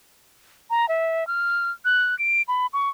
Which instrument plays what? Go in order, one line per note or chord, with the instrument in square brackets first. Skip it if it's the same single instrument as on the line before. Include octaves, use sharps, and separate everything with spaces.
[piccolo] A#5
E5
F6
F#6
D7
B5
C#6